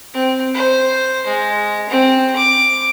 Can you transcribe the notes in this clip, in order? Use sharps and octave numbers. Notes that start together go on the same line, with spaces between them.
C4
C5
G#3
C4
D6